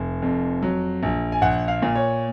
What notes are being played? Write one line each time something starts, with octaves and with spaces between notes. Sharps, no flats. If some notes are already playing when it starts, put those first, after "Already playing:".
Already playing: F1
F2
F#3
A#1
G#5
A#1 F#5
F5
A#2
C#5